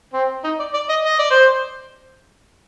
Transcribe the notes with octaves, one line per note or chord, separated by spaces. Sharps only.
C4
D#4
D5
D5
D#5
D#5
D5
C5